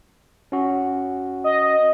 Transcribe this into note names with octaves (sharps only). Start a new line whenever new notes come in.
C#4 F#4
D#5